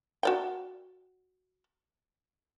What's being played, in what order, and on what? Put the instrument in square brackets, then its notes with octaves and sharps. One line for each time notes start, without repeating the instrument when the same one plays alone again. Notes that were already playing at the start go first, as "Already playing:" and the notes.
[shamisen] F#4 D5 G5